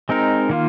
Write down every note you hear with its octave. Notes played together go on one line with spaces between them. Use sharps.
G#3 C4 D#4 A#4
D#3 A#3 F4